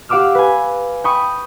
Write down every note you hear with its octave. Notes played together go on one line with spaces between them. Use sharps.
G4 F5 F#5 D6 E6 F6
B4 G#5
G5 B5 C#6 D#6